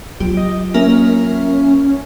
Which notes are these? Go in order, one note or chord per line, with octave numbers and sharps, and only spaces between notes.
F#3 F4 G4
D#5
A#3 C#4 A#4 E5